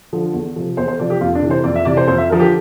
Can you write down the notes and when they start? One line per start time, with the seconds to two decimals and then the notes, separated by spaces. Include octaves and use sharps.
0.13 D3 F3
0.34 E2
0.56 C3 F3
0.77 E2 C5
0.88 C5
0.99 C3 F3 D5
1.10 G4
1.21 F2 F4
1.35 D4
1.42 C3 E3
1.50 C5
1.64 F2 D5
1.76 E5
1.85 C3 E3 D5
1.97 C5
2.07 F2 C5
2.18 E5
2.30 D3 F3 A#4
2.39 G4